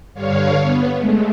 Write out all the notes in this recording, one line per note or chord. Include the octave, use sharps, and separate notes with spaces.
G2 D3 C#5 F5
B3
G#3 A3